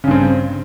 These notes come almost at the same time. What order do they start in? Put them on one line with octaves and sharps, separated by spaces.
C#3 G2 C4